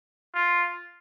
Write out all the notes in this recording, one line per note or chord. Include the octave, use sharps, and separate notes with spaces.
F4